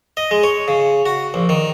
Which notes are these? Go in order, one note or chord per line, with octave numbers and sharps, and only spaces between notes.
D#5
G#3
C#5
C#3
F#4
A#1
D#3